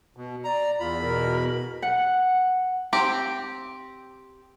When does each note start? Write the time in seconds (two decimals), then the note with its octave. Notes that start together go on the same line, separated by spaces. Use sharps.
0.17 B2
0.44 D5 A#5
0.80 E2 F4 B5
1.01 B2 A#4
1.82 F#5
2.93 C4 G4